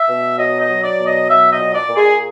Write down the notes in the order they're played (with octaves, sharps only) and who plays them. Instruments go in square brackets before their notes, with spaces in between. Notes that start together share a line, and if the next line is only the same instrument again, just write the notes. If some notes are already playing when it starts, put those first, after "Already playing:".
Already playing: [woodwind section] E5
B2
F#3 D#5
D#5
F#3
D5
B2
D#5
F#3 E5
D#5
A#2
D5
A#2
G#4